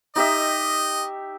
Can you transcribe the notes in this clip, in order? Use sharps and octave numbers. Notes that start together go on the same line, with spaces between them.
D#4 G4 D#5 E5